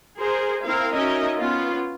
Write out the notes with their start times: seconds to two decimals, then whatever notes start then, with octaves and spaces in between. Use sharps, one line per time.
0.19 G#4 A#4 C5
0.65 C4 E4 A#4 F5
0.94 C#4 D#4 F#4 A#4 D#5 E5
1.39 B3 C#4 F4